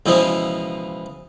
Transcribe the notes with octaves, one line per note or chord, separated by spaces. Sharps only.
C#2 B2 E3 F3 G#4